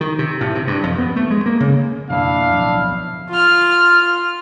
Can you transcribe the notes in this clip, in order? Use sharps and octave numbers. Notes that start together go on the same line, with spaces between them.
D#3
C3
A2
C3
G2
F2
B3
A3
G#3
A#3
C#3
F2 B2 A#3 D4 E4 F5
D1 B1 F3
F4 F6